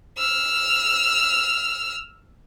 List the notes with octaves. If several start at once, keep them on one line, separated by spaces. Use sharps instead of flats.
E6 F6